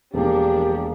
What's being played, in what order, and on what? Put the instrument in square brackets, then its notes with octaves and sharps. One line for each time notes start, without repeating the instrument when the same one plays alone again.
[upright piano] E1 A#3 [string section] F3 D4 [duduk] G4